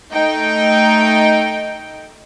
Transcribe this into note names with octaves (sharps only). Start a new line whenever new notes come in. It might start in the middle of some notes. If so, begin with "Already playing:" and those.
A3 D#4 G5